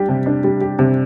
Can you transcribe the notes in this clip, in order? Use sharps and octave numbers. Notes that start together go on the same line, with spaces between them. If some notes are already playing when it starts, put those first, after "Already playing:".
Already playing: G3 D4 G4
C3
D4
G3
G4
C3